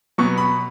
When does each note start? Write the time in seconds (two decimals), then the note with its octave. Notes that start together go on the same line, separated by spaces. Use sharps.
0.18 B2 F#3 B3 C#6
0.38 B5